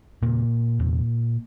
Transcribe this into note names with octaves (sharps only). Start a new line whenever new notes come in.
E2 A#2 C#3 A#3
E2 C3